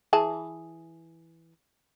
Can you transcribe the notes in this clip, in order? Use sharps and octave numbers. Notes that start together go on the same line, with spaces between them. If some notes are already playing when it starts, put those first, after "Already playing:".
E3 G#4 A5